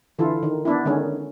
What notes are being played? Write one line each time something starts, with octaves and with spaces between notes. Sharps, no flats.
D3 E3 E4 F4 A4
D#3
B3 D4 E4
D3 D#3 G#3 C#4